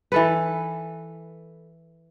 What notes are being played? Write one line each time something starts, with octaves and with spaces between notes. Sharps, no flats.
E3 A4 B4